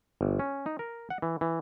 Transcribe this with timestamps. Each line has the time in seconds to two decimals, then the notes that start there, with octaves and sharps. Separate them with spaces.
0.21 G1
0.39 C#4
0.66 D#4
0.79 A#4
1.10 F#5
1.22 E3
1.41 E3